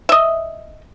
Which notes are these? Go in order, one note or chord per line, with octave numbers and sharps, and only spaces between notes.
D#5 E5